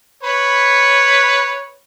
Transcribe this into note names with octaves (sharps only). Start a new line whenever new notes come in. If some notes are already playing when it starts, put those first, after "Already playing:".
B4 C#5 B5